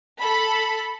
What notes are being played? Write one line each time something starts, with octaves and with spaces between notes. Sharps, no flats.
A4 B5